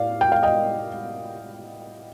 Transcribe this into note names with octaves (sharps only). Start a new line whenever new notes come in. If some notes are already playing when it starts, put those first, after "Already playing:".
Already playing: A2 A3 D5 F5
G5
F5
D#5 G5